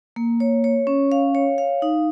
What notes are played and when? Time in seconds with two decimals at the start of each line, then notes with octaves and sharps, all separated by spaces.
0.16 A#3
0.40 C#5
0.64 C#5
0.87 C#4
1.12 F5
1.35 C#5
1.58 F5
1.82 D#4